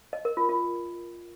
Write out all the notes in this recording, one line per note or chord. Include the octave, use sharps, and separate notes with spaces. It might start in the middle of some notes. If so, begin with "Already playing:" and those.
D#5
A#4
F4
F4